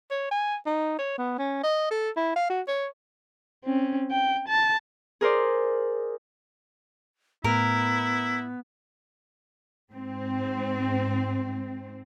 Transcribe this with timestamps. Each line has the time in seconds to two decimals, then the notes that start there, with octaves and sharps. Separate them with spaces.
0.11 C#5
0.31 G#5
0.66 D#4
0.99 C#5
1.18 B3
1.38 C#4
1.63 D#5
1.91 A4
2.17 E4
2.36 F5
2.50 F#4
2.68 C#5
3.65 C4 C#4
4.11 G5
4.48 A5
5.21 G#4 A#4 C5 D5
7.44 A2 B3 E4 A#4
9.92 G#2 C4